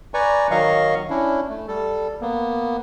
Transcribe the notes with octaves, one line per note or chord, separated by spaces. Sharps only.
B4 D5 G#5 A#5 C#6
D#3 F#3 D#5 F5 C#6
C#4 D4 E4
A3
G3 A4
A#3 B3